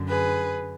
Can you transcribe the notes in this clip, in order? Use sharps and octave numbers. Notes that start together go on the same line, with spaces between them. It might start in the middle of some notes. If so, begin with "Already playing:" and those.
Already playing: F#2 D3
G#4 B4